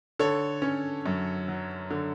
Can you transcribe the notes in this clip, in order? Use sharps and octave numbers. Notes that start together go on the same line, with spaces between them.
D3 A4 C#5
C#4
F#2
F#3
D3